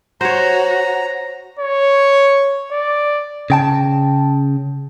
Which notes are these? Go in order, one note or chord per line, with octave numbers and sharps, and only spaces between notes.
F#4 C5 C#5 A#5
C#5
D5
C#3 G5 A5